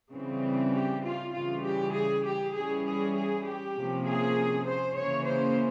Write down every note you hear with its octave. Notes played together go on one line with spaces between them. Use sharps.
C#3 E3 G3 C4
G4
F4
C#3 E3 G3 F4
G4
G#4
G4
E3 G3 C#4 G#4
G#4
G#4
G4
C3 F3 A#3 C#4
G#4
C5
C#3 E3 A#3 C#4 C#5
C5